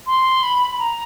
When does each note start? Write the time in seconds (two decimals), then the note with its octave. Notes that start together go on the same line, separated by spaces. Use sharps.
0.07 C6
0.43 B5
0.80 A#5